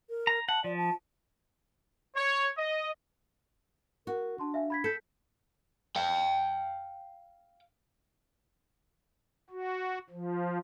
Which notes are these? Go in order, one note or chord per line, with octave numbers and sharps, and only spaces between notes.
A#4
A#5
F#5 A5
F3 D5
A5
C#5
D#5
F#4 A#4
D4 A5 C6
E5 F5 G#5
B5 G#6 B6
A4 G6 B6 C#7
F5 G5
F#4
F3